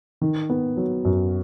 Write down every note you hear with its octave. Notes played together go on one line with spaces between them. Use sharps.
D#3
B3
F#3
F#2